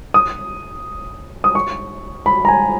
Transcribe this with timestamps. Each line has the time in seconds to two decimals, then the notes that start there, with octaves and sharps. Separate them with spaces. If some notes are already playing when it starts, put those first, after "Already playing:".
0.14 D#6
1.44 D#6
1.55 C#6
2.26 B5
2.45 A#5
2.48 G#5